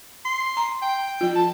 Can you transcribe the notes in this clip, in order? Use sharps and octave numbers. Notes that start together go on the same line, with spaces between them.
C6
A#5
G5
F3 F4
A5